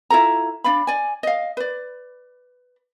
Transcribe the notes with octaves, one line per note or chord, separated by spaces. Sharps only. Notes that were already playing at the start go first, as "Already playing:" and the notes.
E4 F4 A4 A#5
D4 D5 F5 B5
D5 G#5
D#5 F5
B4 D5